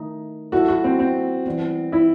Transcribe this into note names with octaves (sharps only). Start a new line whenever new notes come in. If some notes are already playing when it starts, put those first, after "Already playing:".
Already playing: D#3 A3 D#4
F#3 B3 E4 F#4 A4
F#4
C4
C4
E3 G3 B3
E4